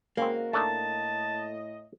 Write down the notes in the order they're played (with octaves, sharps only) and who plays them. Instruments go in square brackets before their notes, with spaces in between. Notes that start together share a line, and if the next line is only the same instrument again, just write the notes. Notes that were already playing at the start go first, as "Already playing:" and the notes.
[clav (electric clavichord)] C#3 C4 [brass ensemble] G#3 F#4 [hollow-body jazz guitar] A#3
[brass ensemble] A2 D#5 [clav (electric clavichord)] A3 D4 D#4 [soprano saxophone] A5